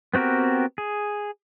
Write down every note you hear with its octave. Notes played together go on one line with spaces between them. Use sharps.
B3 C4 F#4 G4 A#4
G#4